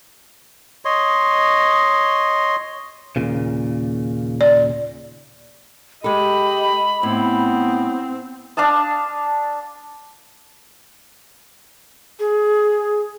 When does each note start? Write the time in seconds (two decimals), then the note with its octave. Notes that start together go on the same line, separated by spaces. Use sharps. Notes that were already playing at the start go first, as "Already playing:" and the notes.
0.85 C#5 D#5 C6
3.16 D#2 A#2 C#3
4.41 D5
6.04 G#3 G4 A4 D#5 B5
7.03 A2 B3 C4
8.57 D4 F5 A5 D#6
12.19 G#4